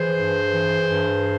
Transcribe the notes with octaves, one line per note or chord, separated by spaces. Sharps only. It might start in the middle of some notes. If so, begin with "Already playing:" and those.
Already playing: E3 G#4 C5
G2
E3
G2